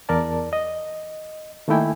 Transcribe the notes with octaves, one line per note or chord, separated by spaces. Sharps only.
E2 A#4 D5 A5
D#5
D#3 A3 A#3 E4 G5 G#5